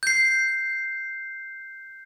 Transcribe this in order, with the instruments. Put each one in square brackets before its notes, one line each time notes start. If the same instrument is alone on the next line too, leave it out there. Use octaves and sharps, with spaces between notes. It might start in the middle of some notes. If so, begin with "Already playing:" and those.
[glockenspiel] G6 C7